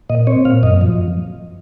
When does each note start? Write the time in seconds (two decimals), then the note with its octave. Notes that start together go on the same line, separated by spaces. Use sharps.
0.09 A#2 D#5
0.27 C4 C#5
0.45 A#2 F5
0.63 F#2 D#5
0.81 F3